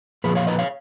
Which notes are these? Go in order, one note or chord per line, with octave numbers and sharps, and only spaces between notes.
A#2 F3 A#3 G#4 B4
C#5 F5
B4 D#5
C#5 F5